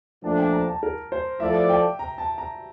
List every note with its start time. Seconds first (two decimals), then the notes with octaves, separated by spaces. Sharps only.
0.24 A#2 F3 A3 D4 A5
0.38 G5
0.52 A#5
0.68 A5
0.83 A#4
1.12 C5
1.40 F3 A3 E4 A4 D5 E5
1.69 G5
1.99 A#5
2.18 A5
2.38 A#5